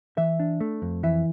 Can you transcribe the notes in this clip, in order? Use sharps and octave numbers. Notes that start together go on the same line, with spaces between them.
E3 E5
D4
A3
F2
E3 E5